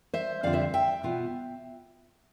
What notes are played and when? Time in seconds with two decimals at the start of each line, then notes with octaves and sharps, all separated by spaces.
0.14 C5 E5
0.43 F2 D3 G3 C4 F4 D5 F5
0.53 C5 E5
0.74 E5 G5
1.03 B2 B3 F4